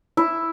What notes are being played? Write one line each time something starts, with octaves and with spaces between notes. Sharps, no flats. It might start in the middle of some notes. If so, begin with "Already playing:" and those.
E4